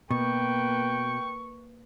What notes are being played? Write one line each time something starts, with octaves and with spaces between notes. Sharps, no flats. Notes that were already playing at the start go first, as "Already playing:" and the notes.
B2 A#3 B4 G5 C#6